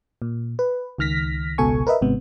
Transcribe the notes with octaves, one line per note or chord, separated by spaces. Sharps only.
A#2
B4
C#2 D#3 F6 A#6 B6
G#1 C#2 B2 A4 G#5 C#6
A#4 B4 D#5 E5
G#1 G#2 C3 B3